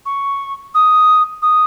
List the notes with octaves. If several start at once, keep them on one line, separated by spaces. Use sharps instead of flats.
C#6
D#6
D#6